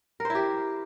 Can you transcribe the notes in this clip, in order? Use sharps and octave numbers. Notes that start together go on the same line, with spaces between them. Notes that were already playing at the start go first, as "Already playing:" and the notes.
E4 G4 A#4 C5